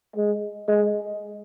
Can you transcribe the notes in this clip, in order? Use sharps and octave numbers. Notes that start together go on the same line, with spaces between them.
G#3
G#3